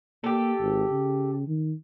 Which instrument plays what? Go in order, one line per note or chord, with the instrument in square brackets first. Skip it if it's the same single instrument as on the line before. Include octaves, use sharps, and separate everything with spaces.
[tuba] A#3 [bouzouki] G4 A4
[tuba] G#1
C#3
D#3